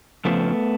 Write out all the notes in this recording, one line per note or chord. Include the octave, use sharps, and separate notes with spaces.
F2 C#3 F3 A3 B3